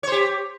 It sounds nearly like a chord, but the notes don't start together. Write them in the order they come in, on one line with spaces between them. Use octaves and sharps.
C#5 C5 G4